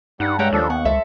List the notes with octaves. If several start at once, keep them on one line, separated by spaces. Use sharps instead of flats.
G2 G3 D#4 F#5
G#3 A3 C#4 G#4 F#5 G5 A#5
D#2 F3 D4 A4
B3 F#5 C#6
C#2 C4 A4 E5